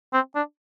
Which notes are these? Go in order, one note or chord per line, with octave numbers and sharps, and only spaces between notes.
C4
D4